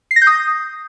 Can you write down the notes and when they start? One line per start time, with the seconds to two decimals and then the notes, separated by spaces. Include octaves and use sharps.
0.11 C7
0.16 A#6
0.22 G6
0.27 D#6